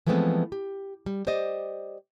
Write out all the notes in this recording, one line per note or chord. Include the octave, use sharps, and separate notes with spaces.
E3 F3 G#3 A3 B3 C4
G4
G3
G4 C5 D5 D#5